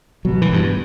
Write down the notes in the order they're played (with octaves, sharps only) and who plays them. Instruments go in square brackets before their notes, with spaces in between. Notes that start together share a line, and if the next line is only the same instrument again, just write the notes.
[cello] B2 [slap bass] F#3
[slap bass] E3
G2